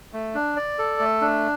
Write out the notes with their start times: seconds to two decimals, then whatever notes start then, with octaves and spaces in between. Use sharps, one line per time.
0.13 A3
0.35 D4
0.57 D5
0.78 A4
1.00 A3
1.21 D4